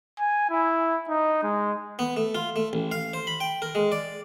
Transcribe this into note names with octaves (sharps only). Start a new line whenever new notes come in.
G#5
E4
D#4
G#3
B3
A3
F4
A3
A1
F5
C5
B5
G5
A#4
G#3
D5